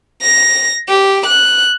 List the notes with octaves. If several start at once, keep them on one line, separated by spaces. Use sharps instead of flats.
A#6
G4
F#6